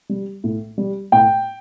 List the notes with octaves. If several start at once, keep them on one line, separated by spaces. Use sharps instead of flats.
G3
A2
G3
A2 G5